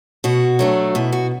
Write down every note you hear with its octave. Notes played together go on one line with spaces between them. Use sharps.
B2 F#4
F#3 A3 D4
B2 E4
F#4